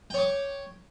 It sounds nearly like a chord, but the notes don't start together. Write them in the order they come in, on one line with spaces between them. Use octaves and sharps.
G5 C#5 D6